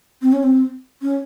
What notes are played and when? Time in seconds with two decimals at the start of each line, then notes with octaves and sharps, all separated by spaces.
0.22 C4
0.33 C#4
0.43 C4
1.02 C#4